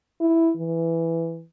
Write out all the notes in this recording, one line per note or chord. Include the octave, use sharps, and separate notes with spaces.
E4
E3